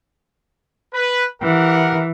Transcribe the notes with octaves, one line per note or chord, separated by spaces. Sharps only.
B4
E3 G4 A#4 F#5